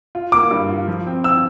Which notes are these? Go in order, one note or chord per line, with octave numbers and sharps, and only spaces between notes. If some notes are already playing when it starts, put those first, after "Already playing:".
F4
A#3 D6
G2
F4
F3
C4
C4 E6